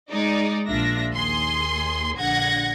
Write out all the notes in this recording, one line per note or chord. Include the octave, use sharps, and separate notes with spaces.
G#3 D#4 D5
A#1 D4 F4 E5 A#6
D#2 G#4 C6
A#1 D3 F#5 G#6 A#6